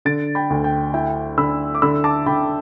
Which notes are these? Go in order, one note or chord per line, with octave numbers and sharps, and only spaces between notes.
D3 A6 D7
G5 B5
D2
G5
E4 G5
D3 B5 E6
D6
D3 B5 E6
A5 D6
D3 G5 B5